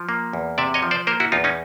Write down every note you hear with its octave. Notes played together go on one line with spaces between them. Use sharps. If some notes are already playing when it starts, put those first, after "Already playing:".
Already playing: F3
A#3
E2
C3 D5 E5
C#5 D#5
F3
C5 D5
A#3 A#4 C5
E4 F#4
E2 D#4 F4
C#4 D#4